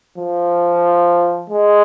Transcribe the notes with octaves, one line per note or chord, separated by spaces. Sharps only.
F3
G#3